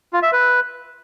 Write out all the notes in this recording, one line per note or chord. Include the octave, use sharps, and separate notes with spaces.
F4
E5
B4